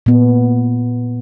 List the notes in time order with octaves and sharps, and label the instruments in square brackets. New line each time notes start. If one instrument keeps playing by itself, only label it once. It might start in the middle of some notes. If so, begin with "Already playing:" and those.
[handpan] A#2 B3